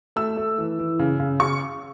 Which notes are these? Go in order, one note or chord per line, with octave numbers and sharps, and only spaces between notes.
A3 E6
A3
E3
E3
C#3
C#3
C#3 C#6